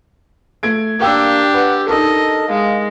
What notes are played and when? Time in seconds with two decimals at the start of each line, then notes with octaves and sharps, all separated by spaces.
0.63 A3 G#6 D7
1.00 A#3 D4 G4 A#4 G5 E6
1.54 B4 F#5
1.89 D#4 A4 A#4 D#5
2.49 G#3 F5